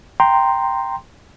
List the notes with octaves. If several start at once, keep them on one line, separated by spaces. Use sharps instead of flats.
G5 A#5 C6